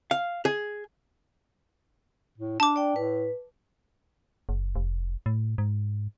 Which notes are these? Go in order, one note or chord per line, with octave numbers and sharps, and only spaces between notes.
F5
G#4
A2
D4 A5 D6
D5 G5
A2 B4
F#1
F1
A2
G#2